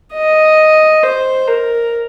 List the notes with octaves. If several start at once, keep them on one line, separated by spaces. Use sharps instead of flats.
D#5
C5
A#4